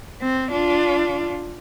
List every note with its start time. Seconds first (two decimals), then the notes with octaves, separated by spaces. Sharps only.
0.21 C4
0.52 D4 F4